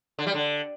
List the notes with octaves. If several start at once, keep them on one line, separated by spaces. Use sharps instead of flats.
D3
G3
D3